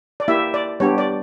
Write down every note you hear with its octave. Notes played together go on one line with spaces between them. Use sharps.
D5
A#3 E4 G4 E5
D5
G3 B3 D4 G4 C#5
D5